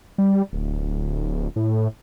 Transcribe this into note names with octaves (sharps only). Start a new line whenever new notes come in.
G3
D1
A2